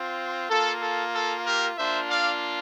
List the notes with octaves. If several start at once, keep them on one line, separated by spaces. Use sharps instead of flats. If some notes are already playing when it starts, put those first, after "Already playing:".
Already playing: C4 F4
A#3 F4 A4
A4
A4
G4 A#4
A#3 D4 F4 C5 E5
D5 F5